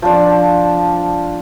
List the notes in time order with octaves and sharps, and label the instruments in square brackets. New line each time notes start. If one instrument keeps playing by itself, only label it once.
[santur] F3 D4